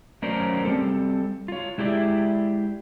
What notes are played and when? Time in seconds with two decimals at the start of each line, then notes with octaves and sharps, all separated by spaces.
0.22 F#3 A3 C#4 A#4 C5 D5
0.65 G3 C4 A4
1.48 F4 C#5
1.78 G#3 E4 G4 G#4 D5 E5